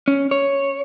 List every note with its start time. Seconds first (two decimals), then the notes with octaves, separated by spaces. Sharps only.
0.08 C#4
0.31 C#5